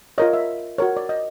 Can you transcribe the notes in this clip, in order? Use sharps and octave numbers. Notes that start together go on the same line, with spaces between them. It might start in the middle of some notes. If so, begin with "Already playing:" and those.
F4 A#4 C#5 D#5
E5
F#4 A#4 C#5
D5
D#5